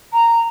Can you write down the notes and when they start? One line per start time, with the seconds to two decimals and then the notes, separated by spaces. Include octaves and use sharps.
0.13 A#5